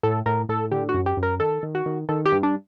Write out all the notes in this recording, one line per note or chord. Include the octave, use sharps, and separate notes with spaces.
A2 A4
A2 A#4
A2 A4
D3 G4
F#4
F#2
G4
F#2
A#4
D#3 A4
D#3
F#4
D#3
D#3 A4
G4
G2
D4